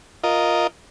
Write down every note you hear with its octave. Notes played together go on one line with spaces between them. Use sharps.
F4 A#4 D#5